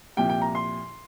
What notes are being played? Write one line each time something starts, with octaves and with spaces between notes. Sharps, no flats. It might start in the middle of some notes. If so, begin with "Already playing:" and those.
C2 A#2 F3 G5
G5
A#5
C6